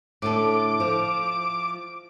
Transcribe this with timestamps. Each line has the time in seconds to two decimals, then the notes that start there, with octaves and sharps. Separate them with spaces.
0.22 A2 D3 A4 D6
0.80 F3